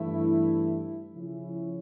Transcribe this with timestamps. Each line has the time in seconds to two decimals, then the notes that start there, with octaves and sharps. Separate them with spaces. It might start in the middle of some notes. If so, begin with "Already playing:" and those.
Already playing: G2 E3 A3 E4
1.14 C#3 F3 C#4 E4